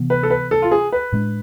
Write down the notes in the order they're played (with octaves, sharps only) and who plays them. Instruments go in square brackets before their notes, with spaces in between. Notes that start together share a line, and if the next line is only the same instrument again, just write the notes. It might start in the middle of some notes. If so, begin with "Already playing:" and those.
Already playing: [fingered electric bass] C3 E3 B3
[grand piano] B4
A4
B4
A4
F4
G#4
B4
[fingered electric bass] A2 G#3 B3 D4